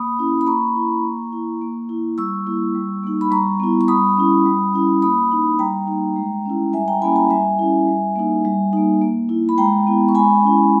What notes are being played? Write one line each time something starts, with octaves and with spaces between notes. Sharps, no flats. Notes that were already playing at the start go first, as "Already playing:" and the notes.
Already playing: A#3 B5 D#6
C#4 E4
B5
A#3 A#5 C#6
E4
A#3
E4
A#3
E4
G3 C#6 E6
A#3 E4
G3
A#3 D#4
B5
G3 A#5 C#6
B3 E4
C#6
G3 B5 D#6
C#4 E4
G3
C#4 E4
A#3 B5 D#6
D#4
G3 G5 A#5
A#3 D#4
G#3
C#4 E4
G3 E5 G#5
G5 A#5
A#3 C#4 E4 G#5 B5
G5 A#5
G3 E5 G#5
C#4 E4
G3
A#3 D#4
G3
A#3 D#4
A#3
E4
B5
G#3 G5 A#5
B3 E4
C#6
G#3 G#5 B5
C#4 E4